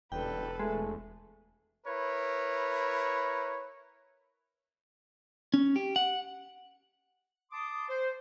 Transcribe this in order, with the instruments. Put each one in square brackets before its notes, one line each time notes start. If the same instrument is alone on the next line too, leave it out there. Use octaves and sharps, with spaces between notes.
[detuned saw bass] E1 [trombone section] A1 G2 D3 [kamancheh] A4 B4 [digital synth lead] G5
[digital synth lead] G#3 [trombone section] A3
[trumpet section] E4 A#4 B4 C#5
[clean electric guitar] C#4
G4
F#5
[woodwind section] A5 C6 D6 D#6
C5